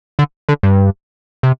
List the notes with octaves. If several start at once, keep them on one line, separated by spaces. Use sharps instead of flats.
D3
D3
G2
C3